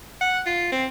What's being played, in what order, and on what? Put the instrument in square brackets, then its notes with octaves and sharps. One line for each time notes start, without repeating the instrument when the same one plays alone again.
[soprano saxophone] F#5
F4
C4